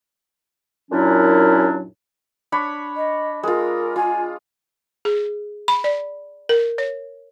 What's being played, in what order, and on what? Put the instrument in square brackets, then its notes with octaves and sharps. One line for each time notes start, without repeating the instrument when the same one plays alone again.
[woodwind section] F#2 A#2 F#3 C#4 D4 E4
[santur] D4 C#5 B5
[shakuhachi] D#5
[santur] G#3 F4 [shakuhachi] A#4
[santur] F4 [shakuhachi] G#5
[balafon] G#4
B5
D5
A#4
C#5